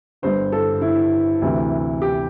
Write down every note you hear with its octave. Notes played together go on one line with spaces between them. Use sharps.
G1 G2 D3 C5
A4
E4
D2 C3 E3
G4